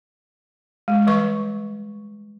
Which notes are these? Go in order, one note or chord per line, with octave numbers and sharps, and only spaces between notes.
G#3
E3 G3 B4 C#6